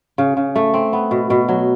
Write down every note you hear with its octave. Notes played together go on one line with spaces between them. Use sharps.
C#3
C#3
A3
C4
B3
B2
B2
F#3